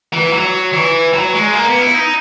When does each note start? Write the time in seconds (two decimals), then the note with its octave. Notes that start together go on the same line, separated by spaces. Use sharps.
0.13 E3
0.33 F#3
0.73 E3
1.13 F#3
1.34 G#3
1.54 A#3
1.68 B3
1.81 E4
1.94 D#4